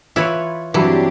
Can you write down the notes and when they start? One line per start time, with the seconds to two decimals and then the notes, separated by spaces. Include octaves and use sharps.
0.16 E3 E4 F4 B4 C#5
0.74 G2 E3 F#3 C4 D4 E4 G4